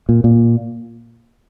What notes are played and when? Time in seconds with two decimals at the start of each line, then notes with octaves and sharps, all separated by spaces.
0.09 A#2
0.24 A#2